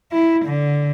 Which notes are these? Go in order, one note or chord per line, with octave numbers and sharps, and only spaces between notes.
E4
D3